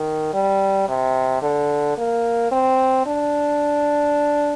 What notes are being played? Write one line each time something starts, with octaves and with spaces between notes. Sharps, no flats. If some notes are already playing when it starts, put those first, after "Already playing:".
Already playing: D#3
G3
C3
D3
A#3
C4
D4